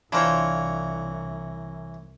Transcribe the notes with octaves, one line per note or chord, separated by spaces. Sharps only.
C2 E3 D4 F4 A#4 C5 C#5